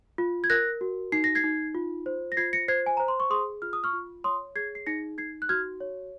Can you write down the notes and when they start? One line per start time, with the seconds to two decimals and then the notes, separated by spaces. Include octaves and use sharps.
0.18 F4
0.44 G#6
0.50 A#4 F#6 A#6
0.81 F#4
1.12 D#4 C7
1.24 A#6
1.35 G#6 C7
1.44 D#4
1.75 F4
2.06 C5
2.32 A#6
2.37 F4 G#6 C7
2.53 A#6 C#7
2.68 C5 G#6 C7
2.86 G#5
2.97 C5 A#5
3.08 C6
3.20 C#6
3.30 G#4 C6 D#6
3.62 F4 F6
3.73 D#6
3.84 C#6 F6
3.93 F4
4.24 C#5 C6 D#6
4.56 G#4 G#6 C7
4.75 C7
4.87 D#4 A#6 C#7
5.18 D#4 G#6 C7
5.42 F#6
5.49 F#4 F6 G#6
5.80 C#5